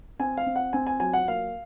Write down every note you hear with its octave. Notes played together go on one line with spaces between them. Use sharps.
C4 G#5
F5
C4
F#5
C4 G#5
G#5
F#3 G#5
F#5
A#3 F5